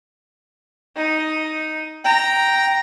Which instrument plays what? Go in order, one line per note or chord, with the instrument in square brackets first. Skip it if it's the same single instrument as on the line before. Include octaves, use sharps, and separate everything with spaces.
[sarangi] D#4
[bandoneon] G5 [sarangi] A#5